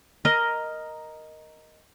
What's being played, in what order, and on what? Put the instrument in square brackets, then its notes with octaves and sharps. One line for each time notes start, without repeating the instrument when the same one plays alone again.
[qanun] A#4 D#5